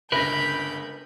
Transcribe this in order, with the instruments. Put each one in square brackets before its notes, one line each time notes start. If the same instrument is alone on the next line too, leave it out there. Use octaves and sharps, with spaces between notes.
[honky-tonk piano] G1 C#2 A#6 [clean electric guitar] A#4 B4 [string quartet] B5 G6